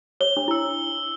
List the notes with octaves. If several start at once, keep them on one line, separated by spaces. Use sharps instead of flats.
C#5 G7
D4
E4 E6